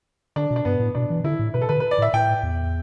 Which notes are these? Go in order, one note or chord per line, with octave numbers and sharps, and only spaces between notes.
D3 D4
B2
D4
G2 B3
A2
B2 D4
E3
D3 E4
A2
B2 B4
A4
D3 B4
B4
D5
A2 E5
A2 G5
E2